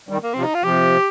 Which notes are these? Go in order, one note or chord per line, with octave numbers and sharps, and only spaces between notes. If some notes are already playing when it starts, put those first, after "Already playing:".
D#3 G3
A#3
C3 F3 C4
D#4
F4
C3 F3 G4